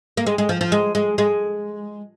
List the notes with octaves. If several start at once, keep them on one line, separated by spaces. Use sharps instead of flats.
A#3
G#3
G#3
F3
F3
G#3
G#3
G#3